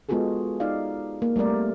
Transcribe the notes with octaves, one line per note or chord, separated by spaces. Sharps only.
G#3 B3 F4 F#4 G#4 A4
D#4 D5 F5
A#3
G3 A3 C4 A#4 D5